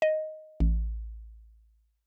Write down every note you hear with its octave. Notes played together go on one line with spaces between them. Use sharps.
D#5
A1